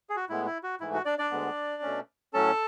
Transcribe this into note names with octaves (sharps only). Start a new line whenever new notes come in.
G#4
F#4
A2 G#3 B3 E4
E4
F#4
G#2 E3 A3 E4
F#4
D4 D5
D4 D5
D2 D3 G#3 B3
B2 A3 C#4
A2 F#3 A3 C#4 A4 A5